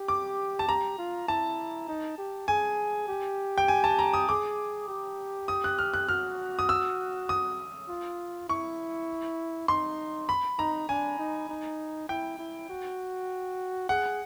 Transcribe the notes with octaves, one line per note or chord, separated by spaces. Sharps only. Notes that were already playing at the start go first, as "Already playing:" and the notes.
Already playing: G4
D6
A5
G4 A#5
F4
E4 A5
D#4
G4
G#4 G#5
G4
G5
G#5
A5
A#5
D#6
G#4 D6
G4
D#6
F#6
F6
F#6
F#4 F6
D#6
E6
D#6
F4
E4 C#6
D#4 C6
B5
D#4 A#5
D4 G#5
D#4
D#4
E4 G5
E4
F#4
G#4 F#5